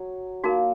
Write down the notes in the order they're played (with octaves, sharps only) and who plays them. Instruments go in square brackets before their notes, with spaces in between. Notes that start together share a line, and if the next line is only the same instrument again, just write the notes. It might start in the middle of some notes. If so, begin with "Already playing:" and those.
Already playing: [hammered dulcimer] F#3
[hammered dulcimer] A#3 [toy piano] D#4 F#4 A#4